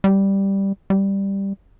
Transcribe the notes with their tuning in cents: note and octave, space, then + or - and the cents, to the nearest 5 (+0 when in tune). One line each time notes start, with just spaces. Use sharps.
G3 +0
G3 +5